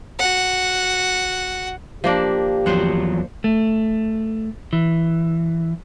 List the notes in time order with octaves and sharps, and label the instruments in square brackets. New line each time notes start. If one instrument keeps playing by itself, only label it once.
[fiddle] F#4 F#5
[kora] F3 A#3 D4 [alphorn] G4
[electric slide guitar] E2 F3 F#3 [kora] C5 F#5
[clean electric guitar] A3
E3